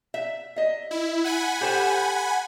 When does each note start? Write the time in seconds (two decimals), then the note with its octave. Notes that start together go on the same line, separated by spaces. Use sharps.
0.14 E5
0.56 D#5 E5
0.91 E4
1.24 F#5 G#5 B5
1.61 G4 A4 C5